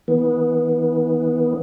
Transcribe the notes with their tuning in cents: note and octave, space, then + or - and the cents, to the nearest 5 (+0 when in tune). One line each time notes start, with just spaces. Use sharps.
E3 -45 B3 -15